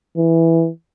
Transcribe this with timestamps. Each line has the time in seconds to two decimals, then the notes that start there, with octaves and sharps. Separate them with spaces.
0.17 E3